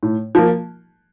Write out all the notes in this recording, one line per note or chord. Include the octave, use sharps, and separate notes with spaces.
A2
F3 A#3